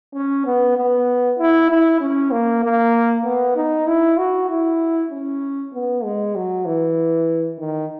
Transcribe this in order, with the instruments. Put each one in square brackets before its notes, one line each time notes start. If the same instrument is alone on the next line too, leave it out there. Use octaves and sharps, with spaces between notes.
[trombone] C#4
B3
B3
E4
E4
C#4
A#3
A#3
B3
D#4
E4
F#4
E4
C#4
B3
G#3
F#3
E3
D#3